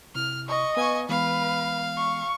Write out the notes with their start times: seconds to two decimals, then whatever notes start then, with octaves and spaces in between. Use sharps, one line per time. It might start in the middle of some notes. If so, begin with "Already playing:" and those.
0.15 C3 E4 F6
0.48 D#5 C#6
0.77 B3 B4 F5 G#5 C#6
1.09 E3 G#3 B3 B4 F5
1.97 C#6